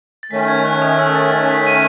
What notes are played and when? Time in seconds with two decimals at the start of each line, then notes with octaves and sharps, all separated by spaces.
0.23 A6
0.31 D#3 A3 C#4 B6
0.48 G#6
0.65 F#6
0.82 D#6
0.99 E6
1.15 A6
1.32 A6
1.50 B6
1.67 D#7